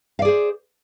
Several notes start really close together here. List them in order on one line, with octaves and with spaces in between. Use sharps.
F5 D5 G#4 C5